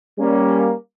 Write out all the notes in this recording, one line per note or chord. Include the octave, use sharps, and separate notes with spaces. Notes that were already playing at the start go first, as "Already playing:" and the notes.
G3 A#3 C#4